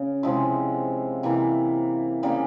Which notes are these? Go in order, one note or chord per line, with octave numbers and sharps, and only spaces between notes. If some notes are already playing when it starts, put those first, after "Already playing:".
Already playing: C#3
C3 F3 G#3 E4
C3 E3 A#3 E4
C#3 G3 A#3